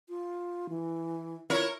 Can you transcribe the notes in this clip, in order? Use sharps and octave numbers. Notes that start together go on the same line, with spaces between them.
F4
E3
E4 F4 A#4 C#5